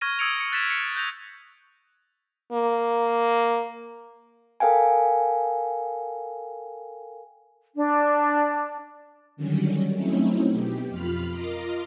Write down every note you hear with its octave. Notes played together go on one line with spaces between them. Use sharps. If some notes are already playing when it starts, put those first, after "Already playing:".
C#6 F6 G#6 A#6 D#7
D#6 E6 G#6 C#7 D7 F7
A#6 C#7
F#6 A6 B6 E7
C#7
F#6 G6 A#6 F7
A#3
A4 A#4 F5 G5 G#5
D4
D3 D#3 F#3 G3 C#4
F#3 A3 C4 C#4 D#4 E4
B2 G4
F2 F4 F5 B5 F6
F4 A#4 D#5 A#5 C6 D6